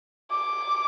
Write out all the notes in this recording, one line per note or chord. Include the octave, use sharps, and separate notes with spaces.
D6